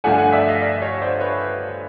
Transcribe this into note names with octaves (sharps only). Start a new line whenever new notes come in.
G2 D3 F3 A3 D4 F#5 G#5
F#5 G#5
D5 E5
D#5 F5
D5 E5
C#5 D#5
C5 D5
B4 C#5